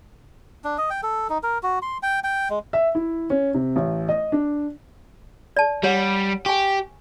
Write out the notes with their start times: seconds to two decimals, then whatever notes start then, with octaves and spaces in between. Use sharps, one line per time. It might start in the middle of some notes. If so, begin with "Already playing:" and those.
0.64 D4
0.78 D#5
0.90 G5
1.03 A4
1.30 D#4
1.43 A#4
1.63 F#4
1.82 C6
2.03 G5
2.24 G5
2.50 G#3
2.73 E5
2.95 E4
3.30 C#4
3.54 C3
3.76 A1
4.09 D#5
4.32 D4
5.57 D5 A5
5.83 G3 G4 C#5 F#5
6.46 G4 G#5 C#6